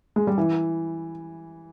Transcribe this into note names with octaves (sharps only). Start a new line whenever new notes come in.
G#3
G3
E3